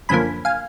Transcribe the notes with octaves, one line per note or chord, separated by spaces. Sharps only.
F#2 D3 F3 A#3 G#5 B5
F5 G#5